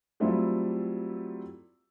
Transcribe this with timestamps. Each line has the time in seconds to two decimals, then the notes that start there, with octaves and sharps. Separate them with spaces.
0.20 F#3 G3 A3 C4 E4 F4